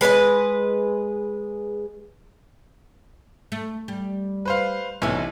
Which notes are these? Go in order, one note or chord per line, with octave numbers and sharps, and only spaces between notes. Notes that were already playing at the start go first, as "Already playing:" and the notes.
G#3 B4 D5 D#5
A3
G3
B4 C5 F5
B1 C3 E3 A3 C#4 E6